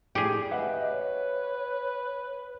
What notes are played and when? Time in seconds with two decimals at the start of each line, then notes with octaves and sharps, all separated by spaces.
0.15 A2 G4 G#4 D5
0.51 B4 D#5 E5 F#5
0.90 C#5